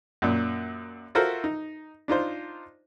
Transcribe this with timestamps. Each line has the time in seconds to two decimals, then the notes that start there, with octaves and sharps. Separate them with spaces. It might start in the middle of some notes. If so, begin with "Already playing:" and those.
0.22 F#2 A#2
1.15 F4 F#4 A4 A#4 C5 E5
1.44 D#4
2.08 D4 D#4 F4 C5